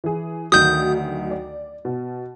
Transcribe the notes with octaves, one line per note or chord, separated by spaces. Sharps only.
E3 G#4
D2 D#3 F#3 D#6 G6
D5
B2